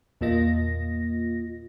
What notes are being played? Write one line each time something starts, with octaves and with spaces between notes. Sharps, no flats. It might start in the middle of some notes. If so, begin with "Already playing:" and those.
E2 A#2 A#3 F4 D#5 A#6